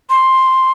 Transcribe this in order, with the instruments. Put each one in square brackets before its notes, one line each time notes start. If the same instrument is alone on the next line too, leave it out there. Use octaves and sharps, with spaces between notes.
[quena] C6